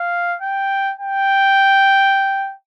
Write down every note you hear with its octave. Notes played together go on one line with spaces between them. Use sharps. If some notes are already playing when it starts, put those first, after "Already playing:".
Already playing: F5
G5
G5